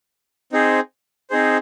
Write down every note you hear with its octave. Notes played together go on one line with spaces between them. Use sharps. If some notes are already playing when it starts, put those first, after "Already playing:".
C4 D#4 G#4 C5
C4 D#4 G#4 C5